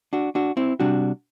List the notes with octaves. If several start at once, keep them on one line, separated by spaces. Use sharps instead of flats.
D4 F#4
D4 F#4
C4 E4
C3 G3 D4 F#4